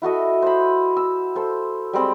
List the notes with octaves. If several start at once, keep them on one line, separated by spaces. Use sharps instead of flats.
E4 F#4 A4 D#5
C5 B5
E6
A4 C5
G3 G#3 C4 B5